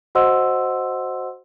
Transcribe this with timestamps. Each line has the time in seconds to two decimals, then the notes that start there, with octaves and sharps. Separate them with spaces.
0.15 F#4 C5 D#5 F#5 C6 E6